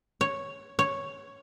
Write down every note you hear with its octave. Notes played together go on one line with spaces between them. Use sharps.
C#5
C#5